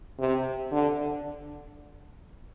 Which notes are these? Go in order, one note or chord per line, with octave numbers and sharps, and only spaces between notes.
C3
D3